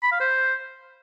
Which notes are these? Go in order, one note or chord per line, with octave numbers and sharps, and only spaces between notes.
B5
F5
C5